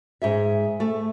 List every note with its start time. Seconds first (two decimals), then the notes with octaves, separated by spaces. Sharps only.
0.22 G#2 G#4 E5
0.80 A3